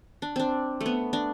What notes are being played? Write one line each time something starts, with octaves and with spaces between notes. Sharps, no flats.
D4
C4 D4
A3
B3
D4